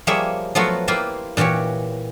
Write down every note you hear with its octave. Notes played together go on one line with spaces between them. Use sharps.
F3 G3 A#3 G#4 C#5 E5
F3 F#3 A3 B3 F4 F#4
A#3 E4 F4 G4 B4 C5
A#2 E3 F#4 G4 C#5